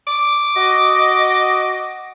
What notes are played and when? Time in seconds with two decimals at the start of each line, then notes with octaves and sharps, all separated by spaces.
0.07 D6
0.56 F#4 D#5